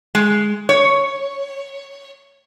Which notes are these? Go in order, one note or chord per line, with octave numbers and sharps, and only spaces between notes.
G#3
C#5